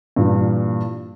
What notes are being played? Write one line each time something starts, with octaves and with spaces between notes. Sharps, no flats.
G2 A#2 E3